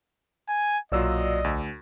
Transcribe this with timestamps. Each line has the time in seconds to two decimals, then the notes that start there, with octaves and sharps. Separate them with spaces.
0.49 G#5
0.92 B1 A#2 F#3 F4 D5 D#5 E6
1.44 D2